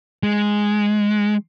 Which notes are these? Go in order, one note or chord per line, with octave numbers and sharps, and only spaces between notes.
G#3